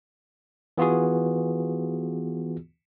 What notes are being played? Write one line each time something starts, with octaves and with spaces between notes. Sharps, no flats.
E3 B3 F4 F#4 G#4